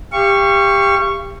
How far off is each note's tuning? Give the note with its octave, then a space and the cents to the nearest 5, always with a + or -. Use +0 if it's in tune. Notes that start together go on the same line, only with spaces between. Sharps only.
G4 +20 F5 -35 C#6 +0